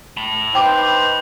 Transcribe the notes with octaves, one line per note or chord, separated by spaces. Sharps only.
A5 B5
D#4 B4 C5 G5 D6